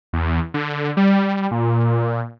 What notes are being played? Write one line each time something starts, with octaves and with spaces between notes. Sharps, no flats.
E2
D3
G3
A#2